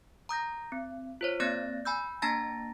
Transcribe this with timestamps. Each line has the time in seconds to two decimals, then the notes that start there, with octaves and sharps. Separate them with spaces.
0.29 A#5 D#6 G6 A#6
0.72 C4
1.21 F4 C5 C#5
1.40 A#3 C4 D5 F#6 A6 A#6
1.85 G#5 B5 E6 G6
2.22 A#3 D4 A5 A#5 A6 A#6